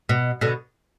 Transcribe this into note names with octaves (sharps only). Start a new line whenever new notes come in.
B2
B2 D3